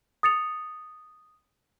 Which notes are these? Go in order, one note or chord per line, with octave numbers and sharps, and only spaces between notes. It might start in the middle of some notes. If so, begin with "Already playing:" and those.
D#6 A6 C#7 F7